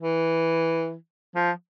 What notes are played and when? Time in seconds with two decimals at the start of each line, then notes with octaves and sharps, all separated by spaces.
0.01 E3
1.35 F3